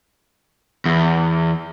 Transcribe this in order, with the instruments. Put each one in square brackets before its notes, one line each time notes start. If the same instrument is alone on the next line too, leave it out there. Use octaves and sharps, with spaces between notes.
[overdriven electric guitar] E2